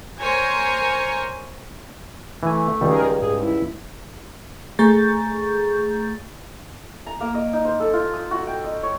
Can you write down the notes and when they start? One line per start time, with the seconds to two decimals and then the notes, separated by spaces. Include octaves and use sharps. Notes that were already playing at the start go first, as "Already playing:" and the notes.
0.21 A#4 C5 C#5 G#5 A#5
2.43 E3 A3 G#5
2.81 C#2 D#3 G3 G#4 A#4
3.22 G#2 G#4
3.41 E4
4.79 A3 G#4 A#5 C#6 G6 A6
7.07 A#5
7.21 A#3
7.35 D#5
7.53 D#4
7.65 C5
7.80 A4
7.93 F4
8.14 D#6
8.31 F#4
8.47 G5
8.64 D#5
8.83 C#5